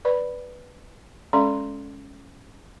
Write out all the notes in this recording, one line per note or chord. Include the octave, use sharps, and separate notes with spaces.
B4 D5 B5
G#3 C#4 A4 D5 B5 C6